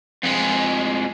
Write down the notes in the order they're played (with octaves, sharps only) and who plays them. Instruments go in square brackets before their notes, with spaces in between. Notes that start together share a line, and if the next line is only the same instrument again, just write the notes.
[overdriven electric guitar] F2 G#3